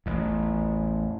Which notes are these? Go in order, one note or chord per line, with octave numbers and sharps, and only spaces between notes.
A1 E2